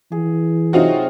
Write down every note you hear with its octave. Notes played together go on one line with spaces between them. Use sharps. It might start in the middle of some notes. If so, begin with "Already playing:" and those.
E3 G#4
C3 F#3 D#4 F4 F#4